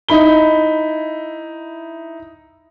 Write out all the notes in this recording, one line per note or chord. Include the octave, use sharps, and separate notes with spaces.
D#4 E4 B5 G7